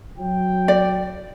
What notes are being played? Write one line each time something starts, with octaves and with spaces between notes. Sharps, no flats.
F#3 G5
D5